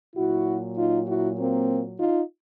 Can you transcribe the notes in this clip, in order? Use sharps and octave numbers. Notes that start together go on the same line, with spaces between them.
A#2 F#3 E4 F#4
D#4 F4
E4 F#4
A#3 C4
D#4 F4